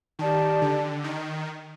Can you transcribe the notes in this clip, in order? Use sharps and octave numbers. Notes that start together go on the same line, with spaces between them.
D#3 G4 D5 A5
D3
D#3